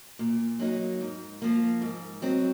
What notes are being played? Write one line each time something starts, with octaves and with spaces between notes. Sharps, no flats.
A#2
F#3 A#3 D#4
G#2
F3 A#3
G#2
F#3 C4 D#4